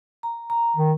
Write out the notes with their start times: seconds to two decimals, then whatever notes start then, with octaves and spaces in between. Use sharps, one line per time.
0.23 A#5
0.50 A#5
0.76 D#3